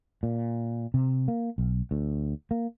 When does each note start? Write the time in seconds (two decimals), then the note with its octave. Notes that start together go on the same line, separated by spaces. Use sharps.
0.23 A#2
0.94 C3
1.28 A#3
1.58 B1
1.91 D2
2.51 A#3